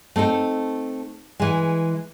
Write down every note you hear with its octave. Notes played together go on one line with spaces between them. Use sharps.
A3 C4 D#4 A4
E3 G#3